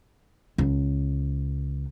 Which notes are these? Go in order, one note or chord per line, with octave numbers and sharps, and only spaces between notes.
C#2